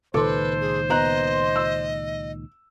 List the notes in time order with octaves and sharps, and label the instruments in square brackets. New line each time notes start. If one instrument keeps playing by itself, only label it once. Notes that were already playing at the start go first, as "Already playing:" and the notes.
[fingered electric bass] C#2 A#2 D#3 [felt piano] A4 D6 [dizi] B4 [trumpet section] C5
[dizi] G#4
[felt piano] B3 A#5 F#6 [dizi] D#5
[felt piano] E6